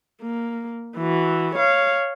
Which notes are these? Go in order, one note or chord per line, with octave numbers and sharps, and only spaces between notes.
A#3
E3 F#4
C#5 F5